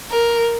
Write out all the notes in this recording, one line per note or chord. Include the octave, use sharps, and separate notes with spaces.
A#4